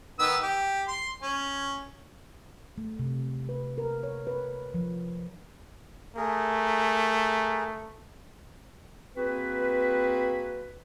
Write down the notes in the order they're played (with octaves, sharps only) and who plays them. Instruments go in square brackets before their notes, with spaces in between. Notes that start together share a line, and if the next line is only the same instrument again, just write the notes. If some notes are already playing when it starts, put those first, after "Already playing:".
[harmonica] D#3 B3 E6
G4
C6
C#4
[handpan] A3
C3
B4
A#4
C#5
B4
F3
[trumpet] A3 [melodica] G#4 A#4
[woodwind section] A#3 C4 F#4 G#4 B4